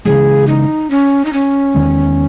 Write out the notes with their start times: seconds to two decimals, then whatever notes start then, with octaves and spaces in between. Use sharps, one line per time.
0.05 C#3 E3 G#3 G#4
0.47 D#4
0.90 C#4
1.25 D#4
1.33 C#4
1.75 E2 D#3 G#3